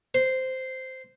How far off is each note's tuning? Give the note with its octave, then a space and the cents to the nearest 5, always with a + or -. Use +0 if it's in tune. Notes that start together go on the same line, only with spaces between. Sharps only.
C5 -10